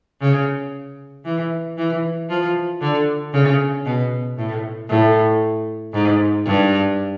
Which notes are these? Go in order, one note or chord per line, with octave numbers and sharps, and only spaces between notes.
C#3
E3
E3
F3
D3
C#3
B2
A2
A2
G#2
G2